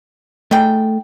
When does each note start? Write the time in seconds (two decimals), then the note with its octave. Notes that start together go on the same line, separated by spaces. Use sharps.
0.51 A3 D#4 G#4 G5